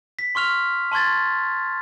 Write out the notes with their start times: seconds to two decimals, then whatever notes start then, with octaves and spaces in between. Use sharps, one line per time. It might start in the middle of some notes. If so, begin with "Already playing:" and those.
0.19 B6
0.35 C6 C#6 F6 F7
0.92 A5 C6 C#6 G#6 A6